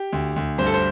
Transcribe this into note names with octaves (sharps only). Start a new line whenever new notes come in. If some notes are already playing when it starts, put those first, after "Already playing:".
Already playing: G4
D2
D2
G2 C5
A4
C5